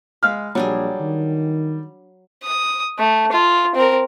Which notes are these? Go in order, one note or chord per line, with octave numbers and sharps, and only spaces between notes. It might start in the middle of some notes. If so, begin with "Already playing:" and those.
G#3 F5 B5 F6
A#1 F#3 G3 D4 G#4
D#3
D#6
A3
F4
C4 A#4